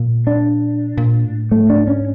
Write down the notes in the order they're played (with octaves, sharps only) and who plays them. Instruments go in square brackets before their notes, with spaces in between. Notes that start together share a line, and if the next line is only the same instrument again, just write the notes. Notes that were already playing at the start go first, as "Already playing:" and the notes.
Already playing: [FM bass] A#2
[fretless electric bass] D4
[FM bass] A#2
A2
[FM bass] G#2 [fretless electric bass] A3
[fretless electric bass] D4
C#4